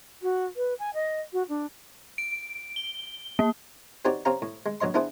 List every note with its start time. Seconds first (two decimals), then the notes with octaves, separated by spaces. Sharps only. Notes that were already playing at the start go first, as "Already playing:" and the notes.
0.22 F#4
0.56 B4
0.79 G#5
0.94 D#5
1.33 F#4
1.49 D4
2.18 D7
2.76 G7
3.39 A#3
4.05 C4 D#4 F#4 G4 C#5 D5
4.25 C4 C#4 G4 F5 A#5
4.42 A2
4.66 G#3
4.80 A#1 F#3 C#5 D#5 C6
4.94 B3 D4 E4 G#4 B4 C5